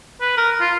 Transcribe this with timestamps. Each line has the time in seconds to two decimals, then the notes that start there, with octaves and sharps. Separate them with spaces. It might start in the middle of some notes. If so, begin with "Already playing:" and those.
0.21 B4
0.37 A#4
0.61 F4